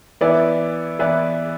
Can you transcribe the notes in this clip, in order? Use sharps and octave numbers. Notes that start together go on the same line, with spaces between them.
E3 B3 E4 B4 D5
E3 B3 E4 B4 D5